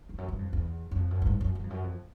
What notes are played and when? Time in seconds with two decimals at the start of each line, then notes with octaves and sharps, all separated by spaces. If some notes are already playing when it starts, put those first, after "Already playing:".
0.09 F2
0.18 F#2
0.28 G2
0.39 F2
0.53 E2
0.91 F#2
0.97 F2
1.11 F#2
1.22 G2
1.27 G#2
1.41 F#2
1.55 G2
1.64 F2
1.70 F#2
1.84 F2